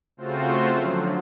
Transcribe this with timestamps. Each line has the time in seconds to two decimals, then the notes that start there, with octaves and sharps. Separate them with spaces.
0.17 C#3 A3 C4 F4 F#4 C5
0.73 D3 F3 F#3